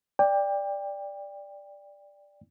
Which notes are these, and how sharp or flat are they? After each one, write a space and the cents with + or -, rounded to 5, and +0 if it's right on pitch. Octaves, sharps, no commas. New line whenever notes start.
D5 +0 G5 +25